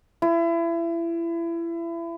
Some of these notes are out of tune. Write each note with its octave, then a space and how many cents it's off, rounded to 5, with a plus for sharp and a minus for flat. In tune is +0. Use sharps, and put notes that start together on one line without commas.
E4 +30